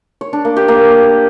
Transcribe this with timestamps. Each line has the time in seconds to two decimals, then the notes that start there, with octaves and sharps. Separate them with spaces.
0.21 C#5
0.33 D4
0.45 A#3
0.57 G4
0.68 A#3